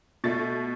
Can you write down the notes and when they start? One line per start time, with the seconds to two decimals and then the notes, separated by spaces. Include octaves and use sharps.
0.24 B2 A3 A6